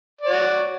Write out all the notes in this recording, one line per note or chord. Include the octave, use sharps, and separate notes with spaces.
F#4 C#5 D5